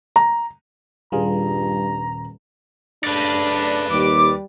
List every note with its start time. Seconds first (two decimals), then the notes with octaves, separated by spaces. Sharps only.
0.16 A#5
1.12 D#1 G2 G3 F4 G#4 B4 A#5
3.04 C#3 A3 D4 B4 D5
3.91 D#2 G3 D6